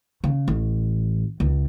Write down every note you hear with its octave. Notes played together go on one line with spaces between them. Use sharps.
C#3
A1
C#2